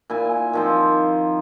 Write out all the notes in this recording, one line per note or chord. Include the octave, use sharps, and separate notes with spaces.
A#2 E4 G#5
D#3 F3 C4